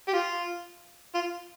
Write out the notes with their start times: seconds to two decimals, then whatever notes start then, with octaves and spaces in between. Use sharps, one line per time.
0.08 G4
0.13 F4
1.15 F4